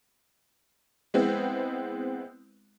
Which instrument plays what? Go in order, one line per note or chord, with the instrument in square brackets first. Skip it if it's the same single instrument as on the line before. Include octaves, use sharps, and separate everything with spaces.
[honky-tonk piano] G#3 B3 C4 E4